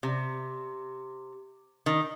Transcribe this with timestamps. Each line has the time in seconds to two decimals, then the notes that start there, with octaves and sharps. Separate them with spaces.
0.03 C3
1.86 D#3